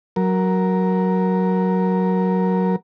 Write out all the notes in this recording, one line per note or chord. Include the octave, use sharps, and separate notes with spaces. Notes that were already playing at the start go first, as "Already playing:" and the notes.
F#3 A#4